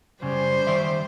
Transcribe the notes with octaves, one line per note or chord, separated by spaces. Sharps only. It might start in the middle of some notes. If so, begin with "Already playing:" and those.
F#2 C#3 G3 C5
D#3 D5 E5